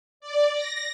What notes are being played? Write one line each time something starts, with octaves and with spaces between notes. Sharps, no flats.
D5
A#6